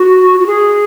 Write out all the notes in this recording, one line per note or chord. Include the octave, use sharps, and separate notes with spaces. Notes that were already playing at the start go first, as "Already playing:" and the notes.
Already playing: F#4
F#4
G#4